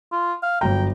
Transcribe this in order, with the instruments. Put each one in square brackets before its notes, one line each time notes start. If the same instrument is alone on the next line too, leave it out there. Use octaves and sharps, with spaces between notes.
[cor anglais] F4
F5
[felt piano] G1 F#3 A#5 [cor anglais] G5